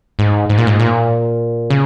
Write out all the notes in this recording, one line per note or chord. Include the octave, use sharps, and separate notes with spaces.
G#2
G#2
A#2
G#2
A#2
C#3